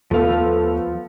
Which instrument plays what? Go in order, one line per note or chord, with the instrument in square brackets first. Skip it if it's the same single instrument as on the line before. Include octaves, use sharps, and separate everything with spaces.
[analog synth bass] D#2 [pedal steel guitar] F3 F5 [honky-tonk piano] A3 B3 A4